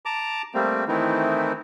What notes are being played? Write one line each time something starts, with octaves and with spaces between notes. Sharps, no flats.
A5 A#5 D6
G3 A3 A#3 C4
D#3 E3 A3 C4 D#4 E4